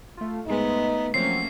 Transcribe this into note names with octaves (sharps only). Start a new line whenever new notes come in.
A3 F4
G#2 G#3 A3 B3 D#4
F3 F#3 A3 A#3 C4 C#4 C7